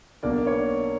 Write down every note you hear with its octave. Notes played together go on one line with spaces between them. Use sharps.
B1 B2 A#3 D4 D5
C#5